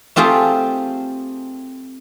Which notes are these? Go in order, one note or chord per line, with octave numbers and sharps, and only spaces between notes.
A3 C4 F4 G4 G#4